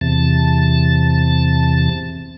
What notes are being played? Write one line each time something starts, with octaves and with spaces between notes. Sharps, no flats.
E2 C3 A5